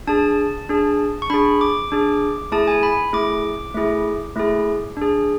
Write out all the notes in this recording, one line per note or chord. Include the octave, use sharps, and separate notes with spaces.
D4 G#4 A5
D4 G#4
C#6
D4 G#4 B5
D6
D4 G#4
A3 E4 G#4 A5
G#5
B5
A3 E4 G#4 D6
A3 E4 G#4
A3 E4 G#4
D4 G#4